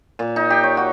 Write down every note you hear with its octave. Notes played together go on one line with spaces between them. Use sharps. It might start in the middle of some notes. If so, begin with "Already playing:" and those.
A#2
D#4
G4
C#5
F#4